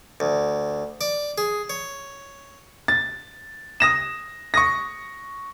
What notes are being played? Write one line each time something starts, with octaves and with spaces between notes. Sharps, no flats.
D2
D5
G#4
C#5
A6
D#6 A#6 E7
C#6 D#6 A#6